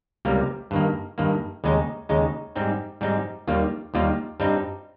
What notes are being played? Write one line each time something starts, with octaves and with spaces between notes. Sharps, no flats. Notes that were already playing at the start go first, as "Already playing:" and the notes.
C#2 C3 G3 A#3
G2 D#3 A#3
G2 D#3 A#3
D#2 C#3 G#3 D#4
D#2 C#3 G#3 D#4
G#2 G3 C4 D#4
G#2 G3 C4 D#4
D#2 D#3 G3 A#3 F4
D#2 D#3 G3 A#3 F4
G2 G3 C4 D#4